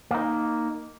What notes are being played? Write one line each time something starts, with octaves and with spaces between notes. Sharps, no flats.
A#3 D#4